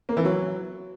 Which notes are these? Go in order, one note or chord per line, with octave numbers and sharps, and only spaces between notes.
A#3
E3
F#3